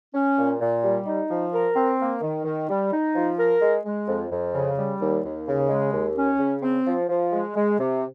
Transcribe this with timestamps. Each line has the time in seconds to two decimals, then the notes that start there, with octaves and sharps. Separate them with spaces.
0.14 C#4
0.37 A#2
0.60 A#2
0.83 G3
1.06 D#4
1.30 F3
1.53 A#4
1.75 C4
1.99 A#3
2.21 D#3
2.45 D#3
2.69 G3
2.92 D#4
3.15 F3
3.37 A#4
3.61 G#3
3.84 G#3
4.08 F2
4.31 F2
4.53 C#3
4.77 G3
5.00 D#2
5.23 D#2
5.47 C#3
5.69 G#3
5.92 D#2
6.16 C#4
6.39 C#3
6.62 C4
6.86 F3
7.09 F3
7.32 G#3
7.55 G#3
7.79 C3